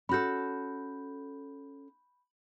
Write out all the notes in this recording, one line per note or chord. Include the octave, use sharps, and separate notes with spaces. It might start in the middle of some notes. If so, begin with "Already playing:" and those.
C#4 F#4 A4 B5 G6